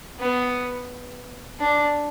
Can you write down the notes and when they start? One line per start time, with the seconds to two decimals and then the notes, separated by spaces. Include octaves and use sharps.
0.19 B3
1.60 D4